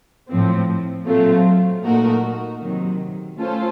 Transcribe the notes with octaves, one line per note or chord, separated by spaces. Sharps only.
A2 F3 C4
A#2 F#3 A3 C4 F4
A#2 A3 D#4 F#4 A#4
C3 D#3 F#3
A3 C#4 F4 A4 C5